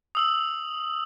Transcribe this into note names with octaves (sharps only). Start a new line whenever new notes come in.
D#6 E6 F#7